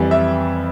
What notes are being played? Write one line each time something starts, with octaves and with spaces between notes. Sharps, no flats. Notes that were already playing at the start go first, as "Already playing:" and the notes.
Already playing: F2 E3 G3
E5